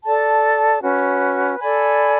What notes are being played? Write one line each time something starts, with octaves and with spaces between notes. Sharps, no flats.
A4 D5 A5
C#4 F#4 B4
A4 D5 G#5 B5